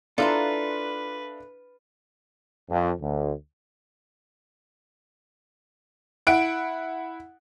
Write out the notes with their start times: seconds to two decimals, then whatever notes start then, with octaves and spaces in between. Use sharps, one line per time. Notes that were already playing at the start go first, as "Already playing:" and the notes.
0.18 D4 E4 F4 A4 B4 F5 A#5 C6
2.70 F2
3.00 D2
6.27 E4 F#5 D7